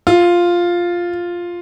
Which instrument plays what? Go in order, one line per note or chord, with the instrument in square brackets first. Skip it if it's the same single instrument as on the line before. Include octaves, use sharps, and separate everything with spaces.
[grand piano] F4